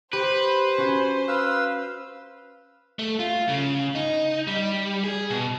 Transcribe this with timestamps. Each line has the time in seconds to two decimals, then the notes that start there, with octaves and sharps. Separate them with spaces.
0.13 G4 B4 C5
0.78 C#4 F#4
1.28 B4 F5 E6
2.99 A3
3.19 F4
3.49 C#3
3.95 D#4
4.47 G3
5.04 G#4
5.30 B2